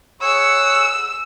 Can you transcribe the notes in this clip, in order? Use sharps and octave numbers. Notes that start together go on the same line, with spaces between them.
G#4 C#5 F#5 E6